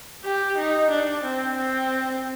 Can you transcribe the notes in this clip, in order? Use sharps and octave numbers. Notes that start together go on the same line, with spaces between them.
G4
D#4
D4
C4
C4